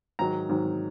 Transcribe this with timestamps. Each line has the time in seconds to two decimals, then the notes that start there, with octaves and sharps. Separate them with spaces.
0.19 G#2 D#3 F#3 A#5
0.49 G#2 D#3 F#3